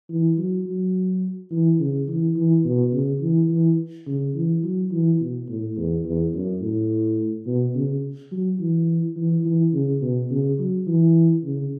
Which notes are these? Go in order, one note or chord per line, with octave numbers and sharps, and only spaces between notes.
E3
F#3
F#3
E3
C#3
E3
E3
B2
C#3
E3
E3
C#3
E3
F#3
E3
B2
A2
E2
E2
F#2
A2
B2
C#3
F#3
E3
E3
E3
C#3
B2
C#3
F#3
E3
C#3